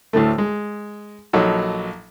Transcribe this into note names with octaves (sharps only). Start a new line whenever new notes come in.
D2 A2 D3 A3
G#3
A#1 F#3 D#4 A4